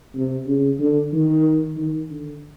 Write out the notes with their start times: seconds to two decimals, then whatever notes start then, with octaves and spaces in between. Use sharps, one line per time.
0.15 C3
0.47 C#3
0.80 D3
1.13 D#3
1.77 D#3
2.11 D3